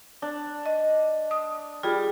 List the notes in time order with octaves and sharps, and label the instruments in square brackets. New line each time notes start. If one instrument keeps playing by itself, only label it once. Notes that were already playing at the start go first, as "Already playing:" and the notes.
[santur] D4
[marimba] D#5
D#6
[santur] G3 [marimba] F4 G#4